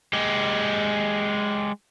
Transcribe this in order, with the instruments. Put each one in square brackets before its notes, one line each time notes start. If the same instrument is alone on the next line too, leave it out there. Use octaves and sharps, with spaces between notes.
[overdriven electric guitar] G#3 G4